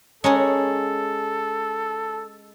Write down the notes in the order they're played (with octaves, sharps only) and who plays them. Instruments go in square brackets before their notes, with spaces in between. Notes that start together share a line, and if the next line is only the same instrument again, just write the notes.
[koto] G#3 [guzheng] C#4 A#4 C#5 [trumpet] A4